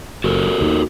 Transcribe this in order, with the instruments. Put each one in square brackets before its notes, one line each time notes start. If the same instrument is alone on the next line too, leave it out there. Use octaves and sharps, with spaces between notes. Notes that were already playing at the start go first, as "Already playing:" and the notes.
[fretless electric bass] F#1 [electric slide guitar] F#4 A4 A#4
[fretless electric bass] D#2 D#3